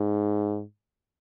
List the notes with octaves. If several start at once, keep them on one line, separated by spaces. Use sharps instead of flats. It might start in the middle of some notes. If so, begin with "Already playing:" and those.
Already playing: G#2